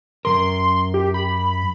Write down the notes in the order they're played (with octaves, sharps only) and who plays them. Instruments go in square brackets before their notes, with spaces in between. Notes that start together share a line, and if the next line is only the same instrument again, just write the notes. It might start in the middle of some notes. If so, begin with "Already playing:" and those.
[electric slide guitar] F#2 C#3 A#4 [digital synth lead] C6
[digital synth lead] G4
B5